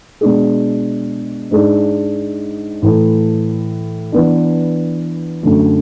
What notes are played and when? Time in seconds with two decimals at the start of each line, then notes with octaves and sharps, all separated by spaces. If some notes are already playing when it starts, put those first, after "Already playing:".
0.21 B2 G#3 D4 G#4
1.51 G#2 G#3 D4 G#4
2.82 A2 E3 A3 E4
4.12 E3 B3 D4
5.43 F#2 D3 A3